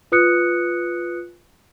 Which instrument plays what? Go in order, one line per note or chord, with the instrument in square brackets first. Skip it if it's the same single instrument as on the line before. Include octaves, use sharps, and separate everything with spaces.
[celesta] F4 B4 D#6 F#6 C#7